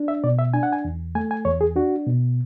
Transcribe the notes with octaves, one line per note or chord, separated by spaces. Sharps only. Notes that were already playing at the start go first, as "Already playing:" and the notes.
Already playing: D4
E5
B2 D5
E5
D4 G#5
F#5
G#5
E2
A3 G#5
G#5
E2 C#5
G#4
D4 F#4
B2